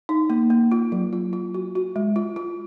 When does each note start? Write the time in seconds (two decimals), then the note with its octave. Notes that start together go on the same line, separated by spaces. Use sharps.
0.09 D#4
0.30 A#3
0.50 A#3
0.72 F4
0.92 F#3
1.13 F4
1.33 F4
1.54 F#4
1.75 F#4
1.96 G#3
2.16 F4
2.36 F4